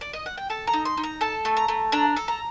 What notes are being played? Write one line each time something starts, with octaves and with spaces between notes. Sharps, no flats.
D5
D#5
F#5
G5
A4 A5
A#5
D#4
C6
D#4
A#5
A4 A5
A3
A#5
A3
D4 A#5
A4
A#5